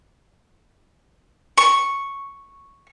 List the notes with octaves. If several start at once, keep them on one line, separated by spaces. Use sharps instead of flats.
C#6